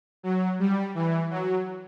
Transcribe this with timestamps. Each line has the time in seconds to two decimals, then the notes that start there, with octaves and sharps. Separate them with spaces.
0.23 F#3
0.59 G3
0.95 E3
1.30 F#3